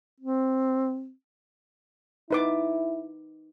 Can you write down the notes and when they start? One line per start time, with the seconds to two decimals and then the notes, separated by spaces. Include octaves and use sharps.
0.20 C4
2.31 D#4 E4 B4 D6